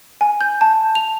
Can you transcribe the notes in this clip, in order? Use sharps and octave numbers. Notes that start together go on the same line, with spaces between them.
G#5
G6
A5
F7